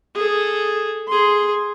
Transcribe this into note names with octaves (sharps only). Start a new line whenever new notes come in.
G#4 A4
G#4 C6